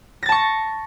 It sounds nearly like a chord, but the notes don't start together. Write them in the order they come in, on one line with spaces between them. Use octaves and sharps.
A#6 A6 A5 C#6